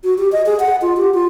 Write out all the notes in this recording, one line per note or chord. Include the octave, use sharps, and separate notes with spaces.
F#4
G4
D#5
G#4
F#5
F4
G4
F4